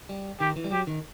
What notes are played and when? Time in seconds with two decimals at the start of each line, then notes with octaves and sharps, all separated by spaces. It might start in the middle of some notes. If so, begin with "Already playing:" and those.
0.09 G3
0.40 D#3 G4
0.56 E3
0.64 G3
0.71 F#3 G4
0.87 D#3